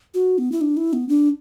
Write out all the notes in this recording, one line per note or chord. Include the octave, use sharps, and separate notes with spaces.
F#4
B3
E4
D4
E4
B3
D4